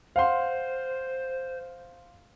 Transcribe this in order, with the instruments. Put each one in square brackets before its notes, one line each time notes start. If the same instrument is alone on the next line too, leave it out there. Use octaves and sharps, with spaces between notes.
[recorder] C5 [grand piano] F5 F#5 C6